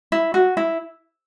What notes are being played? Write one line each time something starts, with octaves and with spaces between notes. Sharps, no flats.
E4
F#4
E4